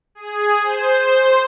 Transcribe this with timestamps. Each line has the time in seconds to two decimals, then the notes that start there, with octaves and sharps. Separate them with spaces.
0.15 G#4
0.62 C5